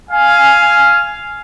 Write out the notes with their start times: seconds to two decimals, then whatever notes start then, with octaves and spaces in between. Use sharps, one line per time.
0.10 F5 G#5